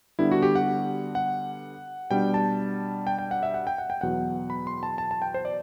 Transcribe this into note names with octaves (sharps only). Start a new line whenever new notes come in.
D3 G3 B3 D4 E4
F#4
G4
F#5
F#5
B2 G3 D4 G5
A5
G5
G5
F#5
E5
F#5
G5
F#5
G5
E2 B2 F#3 F#5
B5
C6
A5
A5
A5
G5
C5
D5